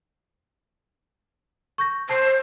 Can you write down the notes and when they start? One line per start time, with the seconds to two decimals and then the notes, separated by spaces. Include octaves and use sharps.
1.78 C#6 G6 A#6
2.09 C5 A5 C7